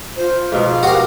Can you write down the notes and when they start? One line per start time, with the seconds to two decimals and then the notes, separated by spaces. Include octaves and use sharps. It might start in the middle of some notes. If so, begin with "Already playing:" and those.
0.16 F4 C5
0.52 G#2 B2 F3 F5
0.83 F#4 G4 A#4